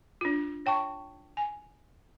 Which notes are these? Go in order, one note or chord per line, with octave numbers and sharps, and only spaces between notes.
D4 F4
C#5 G5 A5 C#6
G#5